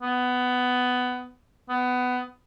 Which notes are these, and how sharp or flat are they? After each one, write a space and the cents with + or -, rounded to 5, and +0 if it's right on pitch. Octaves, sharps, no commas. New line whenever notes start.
B3 +15
B3 +20